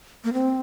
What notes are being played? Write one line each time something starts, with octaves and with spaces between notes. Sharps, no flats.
A#3
C4